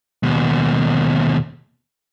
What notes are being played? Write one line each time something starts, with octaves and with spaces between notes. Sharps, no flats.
D#2 B2